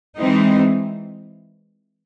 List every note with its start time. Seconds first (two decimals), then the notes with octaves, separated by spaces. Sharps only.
0.19 E3 G#3 C4 D#4